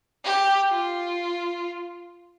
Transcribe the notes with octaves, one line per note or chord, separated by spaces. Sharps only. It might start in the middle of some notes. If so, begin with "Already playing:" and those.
G4
F4